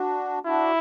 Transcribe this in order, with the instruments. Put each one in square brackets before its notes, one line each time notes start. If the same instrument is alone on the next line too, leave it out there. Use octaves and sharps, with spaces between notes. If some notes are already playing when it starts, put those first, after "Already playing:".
Already playing: [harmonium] D4 F#4
[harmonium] D4 F#4 [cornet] E4